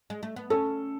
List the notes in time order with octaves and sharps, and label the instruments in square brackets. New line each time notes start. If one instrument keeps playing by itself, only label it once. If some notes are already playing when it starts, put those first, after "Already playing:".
[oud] G#3
A3
B3
[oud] C#4 [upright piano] A4